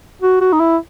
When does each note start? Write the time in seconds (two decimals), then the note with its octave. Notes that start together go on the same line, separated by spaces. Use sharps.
0.22 F#4
0.41 F#4
0.53 D#4
0.60 E4